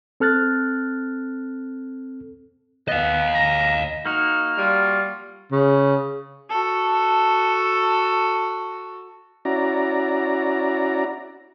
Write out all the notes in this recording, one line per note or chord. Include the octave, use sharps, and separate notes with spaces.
C4 A4 F6 F#6 A6
B3 D#5 F5
A#5
A#3 D#4 F#4 F6
G3 F4
C#3
F#4 A4
C#4 E4 F#4 D5 A#5